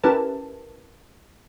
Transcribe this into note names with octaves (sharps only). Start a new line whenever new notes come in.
C#4 E4 G4 A#4 B4 A5